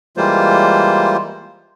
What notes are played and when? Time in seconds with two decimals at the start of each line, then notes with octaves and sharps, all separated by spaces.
0.17 E3 G3 G#3 A#3 F4 C5